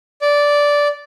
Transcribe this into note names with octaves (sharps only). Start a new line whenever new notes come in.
D5